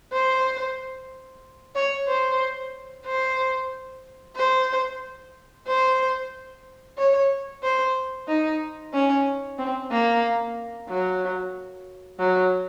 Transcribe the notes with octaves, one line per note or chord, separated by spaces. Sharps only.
C5
C#5
C5
C5
C5
C5
C#5
C5
D#4
C#4
C4
A#3
F#3
F#3